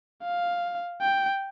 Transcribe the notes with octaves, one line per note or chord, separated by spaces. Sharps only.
F5
G5